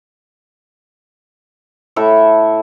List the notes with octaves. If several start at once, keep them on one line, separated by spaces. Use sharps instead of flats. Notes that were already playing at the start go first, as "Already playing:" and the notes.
A2 E4 A4 E5